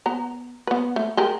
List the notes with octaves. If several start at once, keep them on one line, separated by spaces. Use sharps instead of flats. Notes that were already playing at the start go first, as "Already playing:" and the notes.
B3 A#5
B3 B4
A3
G4 G#4 A#4